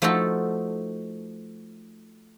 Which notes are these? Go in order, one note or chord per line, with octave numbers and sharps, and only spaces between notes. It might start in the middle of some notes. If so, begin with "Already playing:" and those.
F3 A3 D#4 F4 F#4 A4